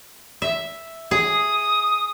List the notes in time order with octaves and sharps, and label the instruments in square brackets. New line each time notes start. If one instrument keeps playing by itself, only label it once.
[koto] E5
[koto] G#4 [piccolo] D#6